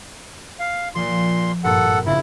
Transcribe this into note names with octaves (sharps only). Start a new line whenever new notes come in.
F5
A#2 F3 C6
G#1 G2 A#2 A4 F#5
A#1 A#2 C#3 E4